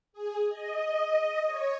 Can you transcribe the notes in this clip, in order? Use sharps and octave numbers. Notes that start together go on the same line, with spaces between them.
G#4
D#5
C#5